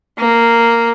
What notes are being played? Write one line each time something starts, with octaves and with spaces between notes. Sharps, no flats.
A#3